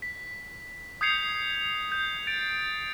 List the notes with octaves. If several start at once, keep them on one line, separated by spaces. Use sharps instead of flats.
B6
D#6 G6 G#6 C7 C#7 F7
G6
A6 D7